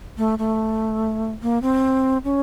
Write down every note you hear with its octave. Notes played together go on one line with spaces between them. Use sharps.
A3
A3
A#3
C4
C#4